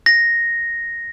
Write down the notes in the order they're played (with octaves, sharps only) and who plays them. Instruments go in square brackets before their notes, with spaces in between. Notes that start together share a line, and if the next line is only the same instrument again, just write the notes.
[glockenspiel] A#6